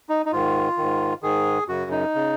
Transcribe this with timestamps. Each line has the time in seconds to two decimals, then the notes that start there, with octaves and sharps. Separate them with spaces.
0.09 D#4
0.26 D#4
0.32 G#2 D#3 F4
0.77 G#2 D#3
1.22 G#2 D#3 G#4
1.68 F#2 C#3 F#4
1.91 D#4
2.15 C#3